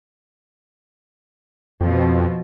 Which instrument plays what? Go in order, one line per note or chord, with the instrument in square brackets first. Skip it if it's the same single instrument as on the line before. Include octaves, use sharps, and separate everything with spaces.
[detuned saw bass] F2 [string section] B2 F3